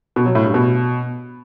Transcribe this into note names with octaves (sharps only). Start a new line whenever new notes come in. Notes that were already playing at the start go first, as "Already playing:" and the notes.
B2
F#3
A2
G2
B2